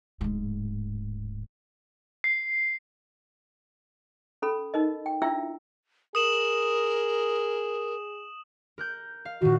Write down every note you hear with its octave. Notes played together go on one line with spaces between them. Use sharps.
D1 G#2
C7
C#4 A4 B5
D#4 A#4 D#5
G5
D4 E4 F4 E5 G5 E6
G#4 A#4 D#6 E7 F#7
A#4 F#6 G6
F5
A#2 D#3 F#4